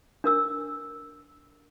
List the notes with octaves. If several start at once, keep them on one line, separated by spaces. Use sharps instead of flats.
D4 A#4 E6